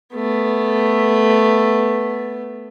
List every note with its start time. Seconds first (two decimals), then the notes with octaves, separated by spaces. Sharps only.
0.15 A3 B3